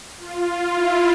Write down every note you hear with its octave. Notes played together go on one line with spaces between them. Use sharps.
F4
E4